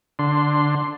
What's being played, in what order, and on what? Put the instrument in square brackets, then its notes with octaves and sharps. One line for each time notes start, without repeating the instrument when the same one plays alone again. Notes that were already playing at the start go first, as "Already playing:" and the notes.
[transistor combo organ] D3 C6